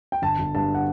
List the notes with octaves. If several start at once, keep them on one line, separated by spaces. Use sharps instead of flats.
G5
G1 A5
G1
G2 A5
F#5